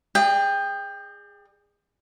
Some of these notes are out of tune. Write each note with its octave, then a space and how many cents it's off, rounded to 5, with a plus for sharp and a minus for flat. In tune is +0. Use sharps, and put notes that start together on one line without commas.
G#4 -15 D5 +40 G5 +20